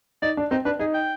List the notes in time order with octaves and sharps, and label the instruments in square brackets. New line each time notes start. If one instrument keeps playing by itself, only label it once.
[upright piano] D#4 [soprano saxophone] D5
[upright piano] D4
[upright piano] C4 [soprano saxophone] D#4
[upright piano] D4 [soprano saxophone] B4
[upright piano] D#4 [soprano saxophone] G#4
[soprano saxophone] G5